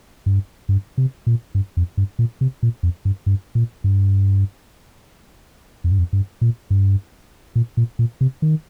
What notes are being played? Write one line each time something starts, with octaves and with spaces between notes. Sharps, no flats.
G2
G2
C3
A#2
G2
F2
G2
A#2
C3
A#2
F2
G2
G2
A#2
G2
F2
G2
F2
G2
A#2
G2
A#2
A#2
A#2
C3
D#3